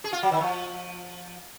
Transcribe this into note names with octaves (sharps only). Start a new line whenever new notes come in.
G#4
F4
F#3
D#3
F3